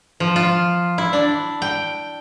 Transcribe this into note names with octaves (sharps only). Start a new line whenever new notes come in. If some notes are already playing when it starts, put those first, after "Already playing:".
F3
F4
E4
D4
G5